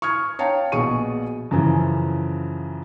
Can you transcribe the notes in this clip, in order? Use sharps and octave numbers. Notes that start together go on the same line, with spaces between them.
C#6 D#6 F6 G#6
C#5 F5 G5 A5 A#5
A#1 B2 G#4 C#6 D#7
F#2 C#3 E3 F3